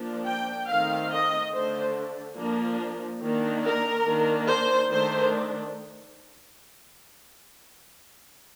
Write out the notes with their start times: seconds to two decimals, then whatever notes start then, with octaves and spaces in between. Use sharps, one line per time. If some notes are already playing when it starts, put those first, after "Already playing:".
Already playing: F3 A#3 D4
0.26 G5
0.68 D#3 A3 C4 F5
1.10 D#5
1.52 D3 A3 D4 C5
2.37 F3 A#3 D4
3.22 D#3 A#3 D4
3.64 A#4
4.06 D#3 A#3 D4
4.48 C5
4.90 D#3 A3 D4 C5